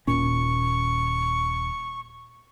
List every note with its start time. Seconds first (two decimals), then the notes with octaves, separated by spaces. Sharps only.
0.07 D#1 A#2 C#4 C#6